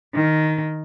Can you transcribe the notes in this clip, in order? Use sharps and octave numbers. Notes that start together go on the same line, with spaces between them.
D#3